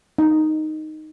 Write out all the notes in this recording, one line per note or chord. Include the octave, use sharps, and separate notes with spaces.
D#4